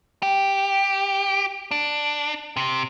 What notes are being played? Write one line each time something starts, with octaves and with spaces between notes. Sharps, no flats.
G4
D4
C3